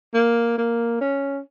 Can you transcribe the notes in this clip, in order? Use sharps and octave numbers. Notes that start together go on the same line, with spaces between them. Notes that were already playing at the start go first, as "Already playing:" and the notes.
A#3
A#3
C#4